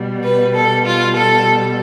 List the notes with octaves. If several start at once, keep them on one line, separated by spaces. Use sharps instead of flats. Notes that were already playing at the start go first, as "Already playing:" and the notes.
Already playing: B2 G3
B4
A4
F4
A4